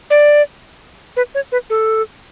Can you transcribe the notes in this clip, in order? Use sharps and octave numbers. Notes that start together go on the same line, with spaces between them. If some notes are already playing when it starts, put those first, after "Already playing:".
D5
B4
C#5
B4
A4